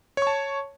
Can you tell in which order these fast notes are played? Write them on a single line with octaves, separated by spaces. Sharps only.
C#5 C#6 A5